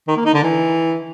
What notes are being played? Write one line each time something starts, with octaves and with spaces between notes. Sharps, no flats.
D#3
A#3
D#4
D3
E3